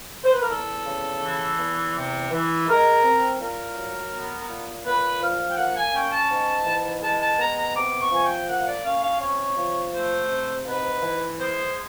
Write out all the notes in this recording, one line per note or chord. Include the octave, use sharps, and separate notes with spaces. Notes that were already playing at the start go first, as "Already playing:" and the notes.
C5
B4
A#4
E2 A4
C#3
E3
E2
C3
E3
G#3 A#4
C4
A#2 A#4
F#3
B3
A#2
A#2 B4
F3 F5
G5
A#3 F#5
G#5
C#4 G5
A5
G#2
E3
G#3 A5
A5
B3 A#5
A#5
C3 D6
C#6
F3 G#5
G5
A#3 F#5
D5
C#4 F5
F5
C3 C#5
F3
A3 C5
C3
G#2 B4
E3
G#3 C5